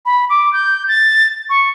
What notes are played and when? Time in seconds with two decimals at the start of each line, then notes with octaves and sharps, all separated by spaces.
0.06 B5
0.30 D6
0.53 G6
0.88 A6
1.50 C#6